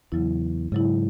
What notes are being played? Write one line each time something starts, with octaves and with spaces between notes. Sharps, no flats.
E2 C#3 F#3 E4
G#2 C#3 F#3 E4